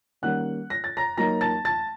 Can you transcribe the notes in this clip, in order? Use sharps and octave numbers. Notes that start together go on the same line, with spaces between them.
D#3 G3 A#3 C#4 F#5 F#6
A#6
A6
A#5 A#6
F#3 A#3 D#4 A#5 A#6
A5 A6
A5 A6